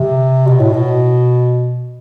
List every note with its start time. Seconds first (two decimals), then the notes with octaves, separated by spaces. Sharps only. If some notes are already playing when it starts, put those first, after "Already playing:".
Already playing: C3
0.47 B2
0.60 A2
0.73 B2